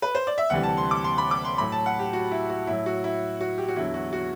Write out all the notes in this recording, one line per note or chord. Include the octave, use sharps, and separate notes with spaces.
B4
C5
D5
E5
D2 C3 E3 G3 F#5
A5
C6
D6
C6
B5
D6
C6
A2 F#3 B5
A5
F#5
G4
F#4
E4
F#4
A2 F#3 E4
F#4
E4
F#4
G4
F#4
E2 D3 F#3 E4
F#4
F#4